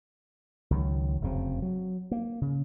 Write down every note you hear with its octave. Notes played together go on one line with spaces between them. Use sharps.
C#2 D#3 F#3
F1 F#2 C#3 C4
F#3
A#3
C#3